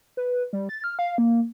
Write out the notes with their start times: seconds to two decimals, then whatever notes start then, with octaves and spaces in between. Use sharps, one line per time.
0.17 B4
0.53 G3
0.69 A6
0.84 F6
0.99 F5
1.18 A#3